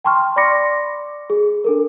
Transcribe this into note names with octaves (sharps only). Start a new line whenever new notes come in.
G5 A5 C6 C#6 F6
D5 B5 C6 D6 A#6 C#7
G#4
D4 A4 A#4